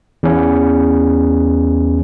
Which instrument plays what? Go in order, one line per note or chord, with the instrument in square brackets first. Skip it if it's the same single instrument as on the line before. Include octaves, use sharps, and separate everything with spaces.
[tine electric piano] E2 C#4